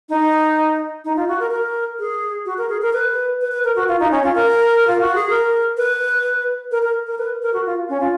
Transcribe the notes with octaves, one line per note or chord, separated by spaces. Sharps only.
D#4
D#4
F4
F#4
A#4
A#4
G#4
F#4
A#4
G#4
A#4
B4
B4
B4
A#4
F#4
F4
D#4
C#4
F4
A#4
F4
F#4
G#4
A#4
B4
A#4
A#4
A#4
B4
A#4
F#4
F4
C#4
F4